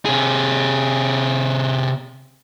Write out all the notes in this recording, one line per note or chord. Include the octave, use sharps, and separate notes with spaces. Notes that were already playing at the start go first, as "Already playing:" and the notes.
C3 G#4